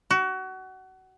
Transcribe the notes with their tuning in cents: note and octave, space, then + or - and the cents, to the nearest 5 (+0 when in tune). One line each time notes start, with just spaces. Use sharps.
F#4 +25